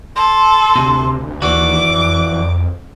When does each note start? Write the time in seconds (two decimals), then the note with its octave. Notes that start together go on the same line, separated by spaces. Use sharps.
0.16 A4 C6
0.75 D2 C3
1.42 D#2 E3 F#4 D5 D6
1.83 F2